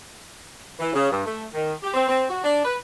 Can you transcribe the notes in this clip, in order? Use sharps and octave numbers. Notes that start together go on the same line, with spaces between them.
E3
C#3
G2
A3
D#3
G4
C4
C4
F#4
D4
B4